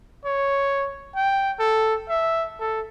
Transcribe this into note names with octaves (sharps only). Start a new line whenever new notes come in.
C#5
G5
A4
E5
A4